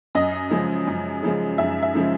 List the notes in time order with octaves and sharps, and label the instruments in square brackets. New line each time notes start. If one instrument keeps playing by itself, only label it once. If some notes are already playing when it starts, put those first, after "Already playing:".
[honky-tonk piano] F#2 D#5
C#3 F3 G#3
F#2
C#3 F3 G#3
F#2 E5
E5
C#3 F3 G#3